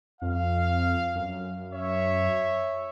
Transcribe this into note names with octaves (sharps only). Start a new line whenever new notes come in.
F2 F5
F#2
C#5 E5